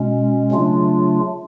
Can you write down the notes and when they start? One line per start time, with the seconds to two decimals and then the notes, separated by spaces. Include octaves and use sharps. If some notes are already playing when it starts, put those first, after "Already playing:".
Already playing: B2 G#3 C#4
0.52 C#3 F#3 A3 D4 F4